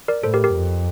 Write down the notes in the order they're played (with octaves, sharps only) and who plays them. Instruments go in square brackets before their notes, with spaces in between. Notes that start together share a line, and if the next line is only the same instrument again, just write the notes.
[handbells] A#4 D5
[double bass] A2 [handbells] A4 C5
[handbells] G4 A#4
G4 A#4
[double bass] F2